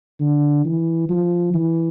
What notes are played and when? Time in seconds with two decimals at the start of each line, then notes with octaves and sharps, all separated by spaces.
0.20 D3
0.65 E3
1.09 F3
1.54 E3